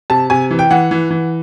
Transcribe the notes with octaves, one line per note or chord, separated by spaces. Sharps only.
C3 A5
C3 G#5
E3
G5
E3 F#5
E3
E3